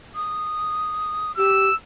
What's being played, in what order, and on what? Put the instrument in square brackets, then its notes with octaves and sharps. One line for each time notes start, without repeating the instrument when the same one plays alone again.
[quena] D#6
[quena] G4 [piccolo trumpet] E6